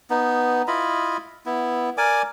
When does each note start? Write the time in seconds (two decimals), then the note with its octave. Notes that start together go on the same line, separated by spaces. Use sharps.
0.10 B3 D#4
0.68 E4 F4 D#5 B5
1.46 B3 E4
1.97 A#4 D5 G#5 D6